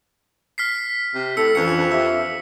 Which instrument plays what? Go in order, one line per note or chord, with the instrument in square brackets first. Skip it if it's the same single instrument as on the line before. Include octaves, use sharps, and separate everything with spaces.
[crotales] F6 B6 C7
[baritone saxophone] C3
[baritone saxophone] A2 [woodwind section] A4 [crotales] E6 C#7
[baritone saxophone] F2 [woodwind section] E3 C#4 D4 [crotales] C#7
[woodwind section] G4 E5 [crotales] E6